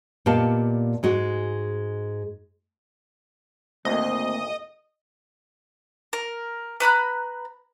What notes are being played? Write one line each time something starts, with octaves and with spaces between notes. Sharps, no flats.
A#2 B3 G4 D#5 F5 A5
G#2 G#3 F#4
G#1 D2 A3 A#3 C4 D#5
A#4
B4 A#5 B5 F#6